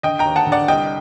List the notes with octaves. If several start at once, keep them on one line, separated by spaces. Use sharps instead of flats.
D3 D#5 G5
G5 A#5
D#2
F#5 A5
D3
D5 F#5
C2 D#5 G5